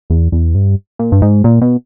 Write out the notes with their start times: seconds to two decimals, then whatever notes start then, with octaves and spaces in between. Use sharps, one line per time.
0.10 E2
0.32 E2
0.55 G2
0.99 A#2
1.12 G2
1.22 G#2
1.44 A#2
1.62 B2